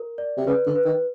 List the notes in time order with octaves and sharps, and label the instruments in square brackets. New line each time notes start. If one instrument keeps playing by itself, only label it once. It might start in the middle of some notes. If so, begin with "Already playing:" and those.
Already playing: [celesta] A#4
D5
[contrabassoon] C3
[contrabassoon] C#3 [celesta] B4
[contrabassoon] D3
[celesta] B4
[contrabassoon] D#3